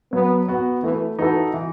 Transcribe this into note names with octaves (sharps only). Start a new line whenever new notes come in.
F#3 B3
B3 F#4
E3 A3
E3 D#4 F#4 A4
E3